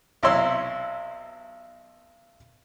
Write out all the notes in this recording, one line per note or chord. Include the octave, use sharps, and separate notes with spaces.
B1 C3 E4 C#5 C6 E6